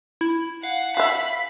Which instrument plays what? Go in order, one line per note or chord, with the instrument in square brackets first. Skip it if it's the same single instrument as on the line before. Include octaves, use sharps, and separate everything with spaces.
[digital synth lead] E4
[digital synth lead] F5 [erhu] F#5
[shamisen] F#4 E5 [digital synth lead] F5 [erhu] B5